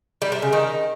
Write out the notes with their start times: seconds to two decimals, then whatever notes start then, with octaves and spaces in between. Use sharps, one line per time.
0.22 G3
0.32 C3
0.42 C#3
0.53 D#3